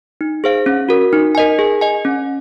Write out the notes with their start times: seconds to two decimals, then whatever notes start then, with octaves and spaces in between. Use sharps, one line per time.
0.21 D#4
0.44 G#4 C5 F5
0.66 C#4
0.89 F#4 A#4
1.13 D#4
1.35 A#4 D#5 G#5
1.59 G#4
1.81 D#5 G#5
2.05 C#4